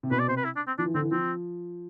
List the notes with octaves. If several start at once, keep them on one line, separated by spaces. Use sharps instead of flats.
C3
B2 B4
D5
C3 C5
B4
E4
D4
C4
F3 D4
E3
D3 C4
E3
F3 C4